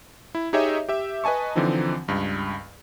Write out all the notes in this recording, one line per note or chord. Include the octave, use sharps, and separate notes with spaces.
E4
D#4 G4 G#4 C#5 D#5 E5
G4 E5
B4 D#5 G#5 A5 C#6
D3 E3 F3 C4 D#4
C#2 G2